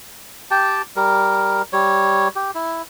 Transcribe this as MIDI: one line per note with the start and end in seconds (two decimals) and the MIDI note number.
0.51 0.82 67
0.51 0.82 79
0.51 0.82 81
0.96 1.62 55
0.96 1.62 70
1.73 2.28 55
1.73 2.28 73
2.36 2.51 67
2.55 2.82 64